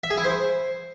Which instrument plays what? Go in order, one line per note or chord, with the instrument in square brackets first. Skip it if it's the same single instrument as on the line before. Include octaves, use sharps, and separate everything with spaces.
[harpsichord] E5
G#4
E4
C5